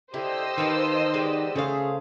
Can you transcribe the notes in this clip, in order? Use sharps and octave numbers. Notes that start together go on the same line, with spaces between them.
D3 E4 G4 C5 D#5 E6
D#3 B4 F5 A5
G#3 B3 G4 D5
C#3 A3 G#4 C5 F5